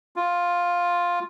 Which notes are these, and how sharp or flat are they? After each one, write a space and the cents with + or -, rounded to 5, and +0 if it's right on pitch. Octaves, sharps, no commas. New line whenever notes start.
F4 +5